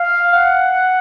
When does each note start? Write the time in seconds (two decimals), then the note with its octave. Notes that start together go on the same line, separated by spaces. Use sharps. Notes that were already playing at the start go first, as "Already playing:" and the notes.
Already playing: F5
0.34 F#5